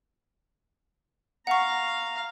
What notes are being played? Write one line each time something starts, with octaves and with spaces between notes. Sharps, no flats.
F5 F#5 A#5 C#6